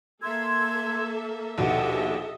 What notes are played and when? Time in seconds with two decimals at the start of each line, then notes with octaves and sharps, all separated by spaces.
0.22 A#3 A4 E5 C6 E6 G#6
1.58 A#1 D#2 B2 A4 D#5 E5 F#5